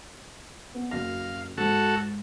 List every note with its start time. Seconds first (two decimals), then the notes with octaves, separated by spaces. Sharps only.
0.74 B3
0.91 F#1 F#4 F5 A#6
1.58 G#2 F#4 A4